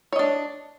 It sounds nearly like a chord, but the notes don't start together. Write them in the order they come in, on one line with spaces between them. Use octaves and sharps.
C#5 D#5 D4